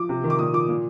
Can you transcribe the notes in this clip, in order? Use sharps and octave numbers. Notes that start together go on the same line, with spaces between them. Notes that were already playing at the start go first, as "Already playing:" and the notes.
Already playing: F3 D6
C3
D#3
D6
A#2 D#6
F3 D6
A#2